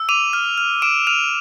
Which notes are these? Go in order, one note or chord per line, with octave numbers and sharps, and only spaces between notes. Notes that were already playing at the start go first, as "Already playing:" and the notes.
Already playing: E6
D6 D#7 F7
F6
F6
D6 D7 E7
F6 D#7 F7